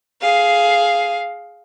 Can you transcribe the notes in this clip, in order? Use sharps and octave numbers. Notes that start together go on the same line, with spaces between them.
G#4 F5